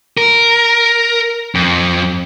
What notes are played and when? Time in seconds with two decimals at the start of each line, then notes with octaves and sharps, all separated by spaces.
0.18 A#4
1.55 F2